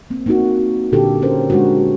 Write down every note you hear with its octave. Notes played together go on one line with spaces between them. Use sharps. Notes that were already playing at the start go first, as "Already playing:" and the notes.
A#3 C4
A#3 D#4 F#4
A#2 D3 D4 G4 A4
C#4 A#4 C5
G#3 D4 F#4